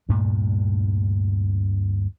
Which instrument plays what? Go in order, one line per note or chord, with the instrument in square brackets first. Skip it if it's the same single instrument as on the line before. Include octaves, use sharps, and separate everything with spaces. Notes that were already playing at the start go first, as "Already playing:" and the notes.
[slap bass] D2 G2 A#2 A3